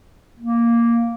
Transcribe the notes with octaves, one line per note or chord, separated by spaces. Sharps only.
A#3